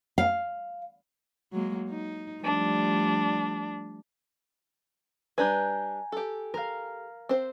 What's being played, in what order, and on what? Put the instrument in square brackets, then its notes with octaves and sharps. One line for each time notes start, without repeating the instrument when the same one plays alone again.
[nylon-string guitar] F5
[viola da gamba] F#3 G#3 A#3
D#4
[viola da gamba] F3 G3 A3 [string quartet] D4
[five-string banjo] G3 D4 B4 [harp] G#5 A#5 G6
[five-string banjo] G4 A4
[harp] A#4 F5
[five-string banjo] C4 C5